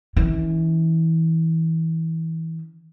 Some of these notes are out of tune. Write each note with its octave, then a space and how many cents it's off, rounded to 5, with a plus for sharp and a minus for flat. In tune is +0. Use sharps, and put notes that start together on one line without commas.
E3 -25 C#4 +0